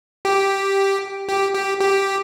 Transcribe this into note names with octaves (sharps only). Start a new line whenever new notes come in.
G4
G4
G4
G4